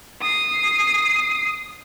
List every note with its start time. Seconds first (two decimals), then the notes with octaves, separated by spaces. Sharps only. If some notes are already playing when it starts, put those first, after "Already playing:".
0.22 D#6 C7